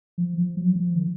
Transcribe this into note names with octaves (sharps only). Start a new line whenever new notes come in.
F3
F3
F#3
F3
D#3